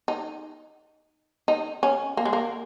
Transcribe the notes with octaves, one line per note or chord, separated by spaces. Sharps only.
D#4
D#4
C#4
A#3
G#3
A#3